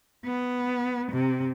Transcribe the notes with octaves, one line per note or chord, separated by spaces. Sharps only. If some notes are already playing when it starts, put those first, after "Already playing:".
B3
C3